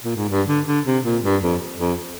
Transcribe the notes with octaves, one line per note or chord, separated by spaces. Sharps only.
A#2
G#2
G2
D3
D3
C3
A#2
G2
F2
F2